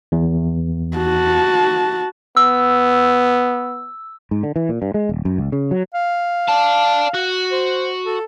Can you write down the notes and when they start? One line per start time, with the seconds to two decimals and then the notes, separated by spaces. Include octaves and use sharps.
0.12 E2
0.97 F#4 A5
2.37 B3 E6
4.31 G#2
4.43 D3
4.56 E3
4.69 A#2
4.82 G2
4.94 G#3
5.09 D#1
5.25 F#2
5.38 C#2
5.52 C#3
5.71 F#3
5.94 F5
6.48 D5 A5
7.14 F#4
7.51 C5
8.05 A4